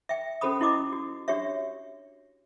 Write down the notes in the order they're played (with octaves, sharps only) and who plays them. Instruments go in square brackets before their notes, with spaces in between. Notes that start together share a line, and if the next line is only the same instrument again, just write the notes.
[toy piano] E5 G5
C#4 F#4 A4 C5 B5 D#6
C#4 E4 F#4 D#5 D6 D#6
F#4
D4 F#4 G4 C#5 E5